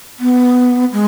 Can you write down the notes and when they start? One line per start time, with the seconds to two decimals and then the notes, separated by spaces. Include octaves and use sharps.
0.20 B3
0.92 G#3